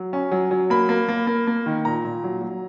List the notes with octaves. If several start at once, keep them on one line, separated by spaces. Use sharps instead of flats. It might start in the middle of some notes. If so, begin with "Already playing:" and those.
Already playing: F#3
C#4
F#3
F#3
A#3 B5
A#3
A#3
A#3
A#3
D#3
A#2 A#5
A#2
F#3
F#3